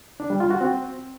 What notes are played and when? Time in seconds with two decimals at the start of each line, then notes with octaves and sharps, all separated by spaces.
0.20 D4
0.30 G3
0.40 F4
0.51 F#4
0.61 C4